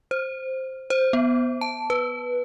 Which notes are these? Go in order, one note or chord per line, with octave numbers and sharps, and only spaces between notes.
C5
C5
B3
A5
B4